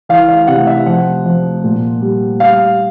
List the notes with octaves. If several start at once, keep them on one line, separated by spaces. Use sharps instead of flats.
E3 F5
F5
C3 F#5
E5
F3 F#5
F3
A#2
G3
G3 F5